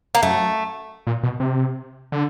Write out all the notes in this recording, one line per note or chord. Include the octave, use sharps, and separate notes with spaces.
A#3
F#2 A3
A#2
B2
C3
D3